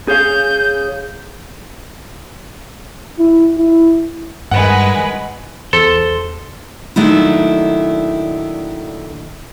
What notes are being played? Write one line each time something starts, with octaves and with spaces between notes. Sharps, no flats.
G#4 C#5 F5 G6
E4
E4
G2 D#3 G3 G#3 B4 F#5
E2 A4 C5
A#2 D#3 F#3 A3 D4 E4